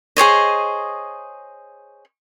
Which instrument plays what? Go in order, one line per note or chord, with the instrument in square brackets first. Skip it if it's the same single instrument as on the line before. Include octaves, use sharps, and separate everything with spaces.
[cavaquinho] G#4 C5 C#5 D#5